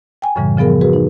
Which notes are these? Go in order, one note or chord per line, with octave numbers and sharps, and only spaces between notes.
G5 G#5
F#2 A2 C#3 E3 G3
C#3 F3 B3 G#4 A#4
F#4 G#4 B4
D#4